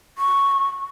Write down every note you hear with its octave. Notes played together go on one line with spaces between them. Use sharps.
C#6